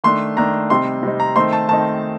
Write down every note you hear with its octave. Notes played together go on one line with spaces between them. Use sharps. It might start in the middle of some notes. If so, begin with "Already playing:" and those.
D#3 A3 D4 C6
D#3 A3 D4 A#5
C3 G3 C4 D#4 C6
C3 G3 C4 D#4
A#5
D#3 A3 C4 D#4 C6
A5
D#3 A3 C4 D#4 A5